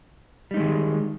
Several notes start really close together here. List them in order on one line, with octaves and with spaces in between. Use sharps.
G3 D#4 G#3 D#3